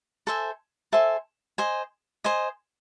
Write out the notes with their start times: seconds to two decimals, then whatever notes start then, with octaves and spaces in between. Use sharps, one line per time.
0.27 A4 C5 E5 G#5
0.92 A4 C5 E5 G#5
1.58 C5 D#5 G#5
2.24 C5 D#5 G#5